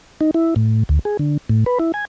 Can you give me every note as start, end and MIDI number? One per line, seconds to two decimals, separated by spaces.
0.21 0.31 63
0.34 0.54 64
0.56 0.83 45
0.89 0.99 38
1.05 1.17 68
1.19 1.38 50
1.50 1.64 45
1.66 1.79 71
1.79 1.92 64
1.94 2.05 80